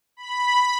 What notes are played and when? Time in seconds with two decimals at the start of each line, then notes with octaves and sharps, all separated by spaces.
0.17 B5